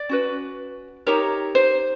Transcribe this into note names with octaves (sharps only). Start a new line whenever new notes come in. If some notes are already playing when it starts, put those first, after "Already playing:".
Already playing: D5
C#4 F#4 B4
D#4 G4 A#4 C#5
C5